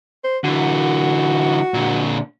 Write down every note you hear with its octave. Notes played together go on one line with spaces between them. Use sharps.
C5
D3 E3 F#4
A#2 D3